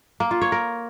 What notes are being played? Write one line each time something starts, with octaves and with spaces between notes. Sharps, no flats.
A#3
F4
C#5
A#4